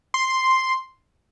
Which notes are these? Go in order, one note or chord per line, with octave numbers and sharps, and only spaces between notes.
C6